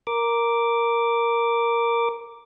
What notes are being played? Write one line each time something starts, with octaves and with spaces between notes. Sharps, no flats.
A#4 D6